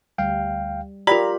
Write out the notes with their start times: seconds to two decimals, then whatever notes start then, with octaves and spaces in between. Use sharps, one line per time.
0.18 D2 G3 F5 G5
1.07 F4 G4 A#4 D5 A#5 B5